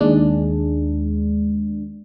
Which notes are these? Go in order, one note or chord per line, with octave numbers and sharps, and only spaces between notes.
D#2 G#3 D4